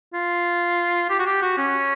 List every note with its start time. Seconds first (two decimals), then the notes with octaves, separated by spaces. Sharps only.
0.14 F4
1.10 G4
1.19 F#4
1.26 G4
1.42 F#4
1.58 C#4